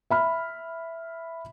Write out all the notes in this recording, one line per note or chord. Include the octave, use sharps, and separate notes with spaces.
E5 B5 F6